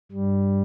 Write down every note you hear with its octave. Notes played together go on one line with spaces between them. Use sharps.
G2 G3